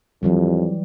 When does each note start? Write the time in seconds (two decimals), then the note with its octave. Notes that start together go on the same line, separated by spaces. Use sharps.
0.23 F2 E3 F#3 G3